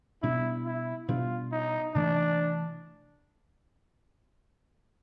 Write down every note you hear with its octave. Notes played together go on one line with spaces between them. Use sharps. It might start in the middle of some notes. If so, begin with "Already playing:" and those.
B2 G3 B3 D4 E4
E4
B2 G3 B3 D4 F4
D#4
C3 E3 A3 D4